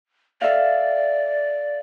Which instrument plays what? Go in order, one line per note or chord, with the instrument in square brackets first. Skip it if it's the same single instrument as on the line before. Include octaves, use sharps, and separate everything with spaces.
[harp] A4 E5 F5 [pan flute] D5